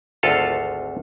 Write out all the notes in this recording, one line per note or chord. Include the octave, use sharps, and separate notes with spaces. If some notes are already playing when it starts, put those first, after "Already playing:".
G#1 D2 F4 A4 F5